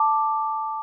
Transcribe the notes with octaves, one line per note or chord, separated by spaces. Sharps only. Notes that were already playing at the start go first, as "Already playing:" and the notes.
Already playing: A5 D6